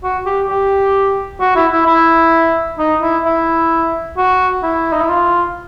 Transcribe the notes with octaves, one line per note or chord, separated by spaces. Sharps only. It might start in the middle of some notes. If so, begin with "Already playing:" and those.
F#4
G4
G4
F#4
E4
E4
E4
D#4
E4
E4
F#4
E4
D#4
E4
F4